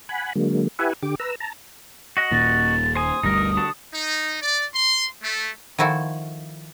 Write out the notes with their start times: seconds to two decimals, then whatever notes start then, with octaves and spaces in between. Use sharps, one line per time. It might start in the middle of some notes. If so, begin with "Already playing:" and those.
0.09 F#5 G#5 B5
0.35 D3 F#3 G#3 A#3
0.79 E4 G4 B4 E5 F#5 G#5
1.03 D3 G4 D6
1.20 B4 A#5 E6
1.40 A5 A#5
2.17 F#4 D#5 F#5
2.32 D#1 D#2 A#2 A6
2.95 C5 G#5 D#6
3.23 G1 D2 G3 D#4 A#4
3.57 D3 F#4 A5
3.94 D#4
4.42 D5
4.75 C6
5.24 A3
5.78 D#3 F3 E4 F#4 A4